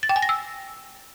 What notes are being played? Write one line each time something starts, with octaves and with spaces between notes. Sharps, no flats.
A6
G5
G#5
A#6
E6